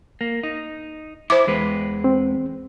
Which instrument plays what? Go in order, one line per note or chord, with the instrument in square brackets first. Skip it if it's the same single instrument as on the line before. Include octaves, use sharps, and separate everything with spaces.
[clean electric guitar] A#3
D#4
[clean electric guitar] E4 [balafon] C5 D6
[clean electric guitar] E2 G#3 B4
[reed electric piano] C4